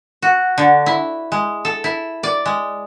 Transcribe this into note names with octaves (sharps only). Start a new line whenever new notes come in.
F#4
D3
E4
G#3
A4
E4
D5
G#3